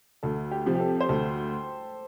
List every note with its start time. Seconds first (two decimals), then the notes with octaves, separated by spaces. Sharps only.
0.23 D2 A4
0.51 G4
0.66 C3 F3
0.75 G4
0.80 A4
1.00 C5
1.09 D2 A4